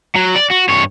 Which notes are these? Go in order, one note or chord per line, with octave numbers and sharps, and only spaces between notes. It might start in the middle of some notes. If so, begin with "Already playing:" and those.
F#3
D5
F#4
G2 C#5